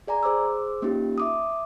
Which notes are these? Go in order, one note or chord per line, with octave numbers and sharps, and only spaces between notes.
G#4 D5 G#5 A#5
G#4 C5 D6 E6
A#3 C#4 D#4 F4 G4
E5 D6 D#6